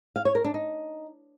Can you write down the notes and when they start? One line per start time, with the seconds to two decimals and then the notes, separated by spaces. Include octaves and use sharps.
0.16 F5
0.25 C#5
0.35 A#4
0.44 D4
0.54 D#4